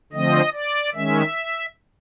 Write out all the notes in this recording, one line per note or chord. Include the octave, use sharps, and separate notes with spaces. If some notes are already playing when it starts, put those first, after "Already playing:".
D3 F3 A3 C4 D#5
D5
D#3 G#3 C#4 E5